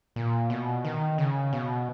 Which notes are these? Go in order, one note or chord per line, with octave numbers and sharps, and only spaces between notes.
A#2
B2
D#3
C#3
B2